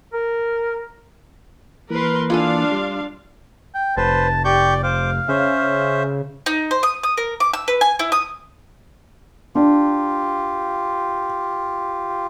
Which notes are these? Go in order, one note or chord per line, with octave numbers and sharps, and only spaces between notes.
A#4
E3 A#3 A#4 B4 C6
D4 F4 A4 F5 G#5
G3 C6
G5
F1 B4 C5 A5
G4 D5 C#6 G6
C5 F5 D6
C#3 C#4 C5 E5
D#4
C5
D#6
D#6
A#4
D6
E6
B4
G#5
E4
D#6
D4 F4 G4